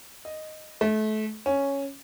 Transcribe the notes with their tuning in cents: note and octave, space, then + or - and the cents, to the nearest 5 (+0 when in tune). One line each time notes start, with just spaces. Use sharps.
D#5 -5
A3 -30
C#4 +0